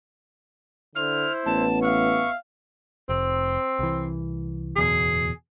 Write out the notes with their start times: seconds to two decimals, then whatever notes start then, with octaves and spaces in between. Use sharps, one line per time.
0.95 D3 E4 C5 F6
1.46 A1 B3 A5
1.82 E5 F5 C#6
3.09 F1 C4
3.79 C2 E3
4.76 D1 E2 B2 G#4